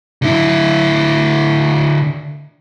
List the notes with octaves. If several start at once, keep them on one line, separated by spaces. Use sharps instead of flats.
D3 E4